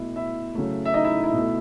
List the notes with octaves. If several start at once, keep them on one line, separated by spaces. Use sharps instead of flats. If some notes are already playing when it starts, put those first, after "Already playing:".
Already playing: B2 A3 E4 E5
E4 E5
C#3 F#3 A3
E5
D#4 D#5
E4 E5
E4 E5
B2 A3